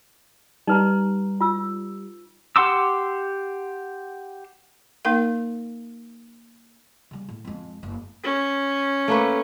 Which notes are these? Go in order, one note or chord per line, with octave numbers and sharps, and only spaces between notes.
G3 D#4 B4 A#5
F4 E6
G4 F#5 C6 D6 E6
A#3 D#4 A#4 F5
C#3 G3
A2
F2 G#3
F#1
C#4
A3 A#3 B4